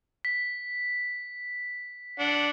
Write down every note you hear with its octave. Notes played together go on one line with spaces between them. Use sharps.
B6
D4 F#5